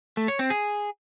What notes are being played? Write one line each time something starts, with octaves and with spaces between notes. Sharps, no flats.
A3
C#5
C4
G#4